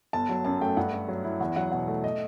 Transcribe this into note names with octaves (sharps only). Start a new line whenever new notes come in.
G1 A5
F#3
F#2 A5
A3 G5
G2 F#5
A3
F#3
E4
E2 F#5
F#3 F#5
B2 F#5
A3
D#5